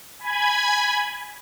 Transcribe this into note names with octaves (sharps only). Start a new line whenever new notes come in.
G#5 B5 G#6